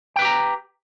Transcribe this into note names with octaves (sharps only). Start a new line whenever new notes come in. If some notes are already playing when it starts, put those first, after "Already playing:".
G4 B4 G5 A#5